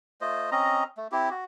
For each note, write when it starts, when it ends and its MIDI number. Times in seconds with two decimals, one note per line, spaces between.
0.21 0.50 57
0.21 0.50 65
0.21 0.50 72
0.21 0.50 75
0.51 0.84 60
0.51 0.84 61
0.51 0.84 75
0.51 0.84 82
0.97 1.08 57
1.12 1.29 60
1.12 1.29 64
1.12 1.29 67
1.30 1.44 66